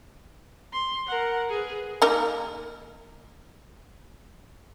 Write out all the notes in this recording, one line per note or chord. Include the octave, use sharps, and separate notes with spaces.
C6
A#4 F#5
G#4 B4
A#3 D#4 A#4